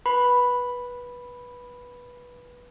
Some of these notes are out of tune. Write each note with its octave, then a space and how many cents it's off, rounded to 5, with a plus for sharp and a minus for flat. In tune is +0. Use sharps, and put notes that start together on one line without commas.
B4 -15 B5 +0